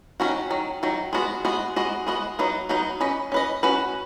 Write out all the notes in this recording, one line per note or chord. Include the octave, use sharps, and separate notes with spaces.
D#3 F#3 C#4 F#4
D#3 F#3
D#3 F#3
G#3 B3 F#4
G#3 B3 F#4
G#3 B3 F#4 D#5
G#3 B3 F#4 D#5
F#3 B3 D#4 B4
F#3 B3 D#4 B4
C#4 B4 D#5
C#4 B4 D#5
C#4 F#4 B4